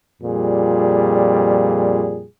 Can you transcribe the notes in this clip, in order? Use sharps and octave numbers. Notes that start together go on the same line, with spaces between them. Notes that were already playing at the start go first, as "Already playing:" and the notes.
F2 A#2 G3 G#4